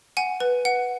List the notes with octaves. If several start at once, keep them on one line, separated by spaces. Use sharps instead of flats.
F#5 G#5
B4
F#5